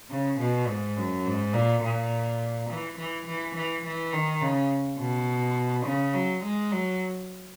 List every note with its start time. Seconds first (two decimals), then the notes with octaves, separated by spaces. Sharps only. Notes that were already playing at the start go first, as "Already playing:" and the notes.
0.10 C#3
0.40 B2
0.68 G#2
0.97 F#2
1.25 G#2
1.54 A#2
1.83 A#2
2.70 E3
2.98 E3
3.27 E3
3.55 E3
3.84 E3
4.13 D#3
4.41 C#3
4.98 B2
5.85 C#3
6.14 F#3
6.43 G#3
6.72 F#3